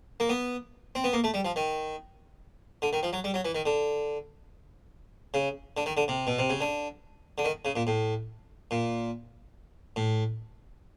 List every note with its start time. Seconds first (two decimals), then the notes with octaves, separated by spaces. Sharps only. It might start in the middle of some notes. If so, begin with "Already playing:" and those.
0.20 A#3
0.29 B3
0.95 C4
1.04 B3
1.13 A#3
1.24 A3
1.34 G3
1.45 F3
1.56 D#3
2.82 D3
2.93 D#3
3.03 F3
3.13 F#3
3.24 G3
3.34 F#3
3.45 E3
3.55 D#3
3.66 D3
5.34 C#3
5.77 D3
5.86 D#3
5.97 D3
6.08 C3
6.27 B2
6.39 C3
6.50 C#3
6.61 D3
7.38 D3
7.45 D#3
7.65 C#3
7.76 A#2
7.87 A2
8.71 A#2
9.96 A2